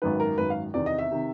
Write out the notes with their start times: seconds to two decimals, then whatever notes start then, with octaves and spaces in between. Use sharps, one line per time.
0.02 G#1 F#2 D#3 B4
0.20 A#4
0.38 G#1 F#2 D#3 B4
0.50 F5
0.74 E2 C3 D#3 D5
0.86 D#5
0.98 E5
1.11 C3 D#3